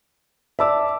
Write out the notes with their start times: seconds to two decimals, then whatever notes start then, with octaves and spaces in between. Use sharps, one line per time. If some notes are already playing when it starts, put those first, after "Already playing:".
0.59 D5 E5 A5 D6 E6